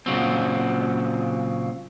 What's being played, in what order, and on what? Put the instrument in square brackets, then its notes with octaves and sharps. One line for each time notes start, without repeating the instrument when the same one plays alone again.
[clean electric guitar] A#2 C#3 F#3 C4